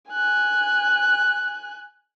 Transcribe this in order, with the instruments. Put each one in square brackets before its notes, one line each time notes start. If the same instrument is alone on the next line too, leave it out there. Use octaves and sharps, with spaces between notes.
[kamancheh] G#5 F#6